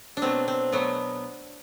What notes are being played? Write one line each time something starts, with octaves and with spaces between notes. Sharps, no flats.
D4
B2 F#3 A3 C4
C4
B2 F#3 A3 B3